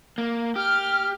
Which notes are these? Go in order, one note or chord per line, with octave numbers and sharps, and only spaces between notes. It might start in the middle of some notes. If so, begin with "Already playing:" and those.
A#3
G4 F6